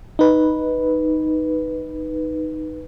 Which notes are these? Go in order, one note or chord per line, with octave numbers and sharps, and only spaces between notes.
D#4 B4